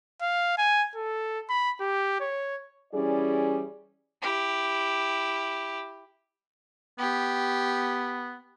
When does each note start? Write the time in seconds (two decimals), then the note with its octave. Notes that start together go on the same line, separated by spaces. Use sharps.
0.22 F5
0.58 G#5
0.95 A4
1.49 B5
1.81 G4
2.20 C#5
2.93 E3 G3 C#4 E4 G#4 D5
4.22 E4 G4
6.99 B3 G4